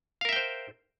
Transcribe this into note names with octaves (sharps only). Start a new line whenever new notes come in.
A#4 C5 E5 F5 G5